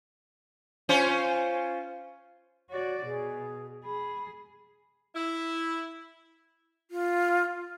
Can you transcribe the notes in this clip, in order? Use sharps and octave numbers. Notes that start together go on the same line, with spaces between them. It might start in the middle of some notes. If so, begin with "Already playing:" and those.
C#4 F4 C5
F#4 C#5 D5
B2 G#4
G#4 B5
E4
F4